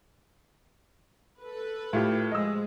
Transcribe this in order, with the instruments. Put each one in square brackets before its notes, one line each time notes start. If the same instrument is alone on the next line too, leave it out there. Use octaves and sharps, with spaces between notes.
[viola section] A4 B4
[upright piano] A2 F4 G4
[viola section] F3 G#3 [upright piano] D#5 E6